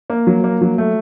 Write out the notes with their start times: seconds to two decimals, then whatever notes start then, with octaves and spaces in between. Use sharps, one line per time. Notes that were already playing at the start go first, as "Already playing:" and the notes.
0.10 A#3
0.27 F#3
0.44 A#3
0.61 F#3
0.78 A3